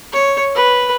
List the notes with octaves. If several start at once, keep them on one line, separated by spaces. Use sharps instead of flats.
C#5
B4